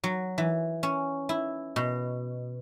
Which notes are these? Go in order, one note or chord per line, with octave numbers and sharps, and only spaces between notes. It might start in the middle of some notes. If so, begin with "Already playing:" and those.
F#3
E3
C#4
E4
B2